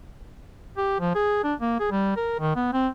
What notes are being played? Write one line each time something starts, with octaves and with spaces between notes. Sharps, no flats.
G4
F3
G#4
D4
A#3
G#4
G3
A#4
D#3
B3
C4